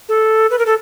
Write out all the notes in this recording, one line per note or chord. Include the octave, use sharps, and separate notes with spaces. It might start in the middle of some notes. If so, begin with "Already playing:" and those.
A4
B4
A#4
A4